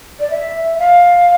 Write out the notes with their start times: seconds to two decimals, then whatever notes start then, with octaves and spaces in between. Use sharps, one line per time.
0.20 D5
0.30 E5
0.78 F5